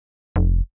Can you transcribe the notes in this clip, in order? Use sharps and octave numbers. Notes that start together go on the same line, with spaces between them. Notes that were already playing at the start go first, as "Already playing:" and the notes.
F1